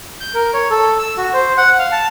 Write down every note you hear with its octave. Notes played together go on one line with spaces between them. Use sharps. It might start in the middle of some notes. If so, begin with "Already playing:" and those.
G6
A#4
C#5
A4
E6
F#4
C5
F#5
F5
A5